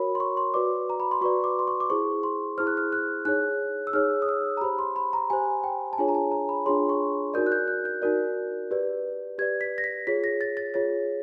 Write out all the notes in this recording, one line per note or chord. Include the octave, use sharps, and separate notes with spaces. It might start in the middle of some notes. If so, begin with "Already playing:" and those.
Already playing: F#4 A#4 C#5 B5
C6
C#6
C6
F#4 B4 D5 D6
A#5
B5
C6
F#4 B4 D5 C#6
D6
C6
C#6
D6
E4 G#4 C5 C#6
C6
E4 G#4 C5 F6
F#6
F6
F#6
D#4 G#4 C#5 F#6
E6
D#4 G#4 C#5 F6
D#6
E6
A#5
G4 C5 B5
C6
B5
A#5
G4 C5 G#5
G5
A5
D4 F4 G#4 C#5 G#5
A#5
A5
A#5
B5
D4 F4 G#4 C#5 C6
C#6
D#4 F#4 A#4 D5 G6
F#6
G6
F#6
G6
D#4 F#4 A#4 D5
G4 B4 D5
G4 B4 D5 G#6
B6
A#6
B6
F4 G#4 C#5 B6
A#6
A6
A6
F4 G#4 C#5 A6